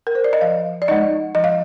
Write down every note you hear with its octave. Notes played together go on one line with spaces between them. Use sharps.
A#4
C5
D5
D#5
F3 F5
D5
G#3 D#4 D#5
F3 D#5
F5